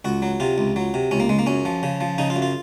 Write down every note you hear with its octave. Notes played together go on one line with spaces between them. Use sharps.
C#2 F#4
F#3
C3 F4
C#2
F#3
C3
C#2 C#4
A#3
C#2 G#3
A#3
F#2 C#4
F3
C#3
F3
C#3 D#4
F4
F#2
F4